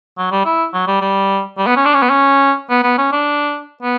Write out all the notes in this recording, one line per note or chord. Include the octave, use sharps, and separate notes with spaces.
F#3
G3
E4
F#3
G3
G3
G3
B3
C#4
D4
C#4
B3
C#4
B3
B3
C#4
D4
B3